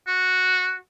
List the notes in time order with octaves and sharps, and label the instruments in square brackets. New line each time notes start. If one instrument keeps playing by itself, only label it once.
[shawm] F#4